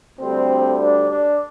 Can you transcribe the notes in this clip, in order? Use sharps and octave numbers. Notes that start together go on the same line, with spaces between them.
D2 D3 G3 C4
D4
D4